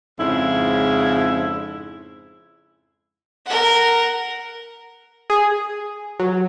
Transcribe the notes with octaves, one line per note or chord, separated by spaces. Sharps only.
F2 G#2 C#3 E4
A#4 F#5
G#4
F#3